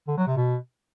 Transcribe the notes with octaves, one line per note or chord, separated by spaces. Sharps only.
D3
F#3
C3
B2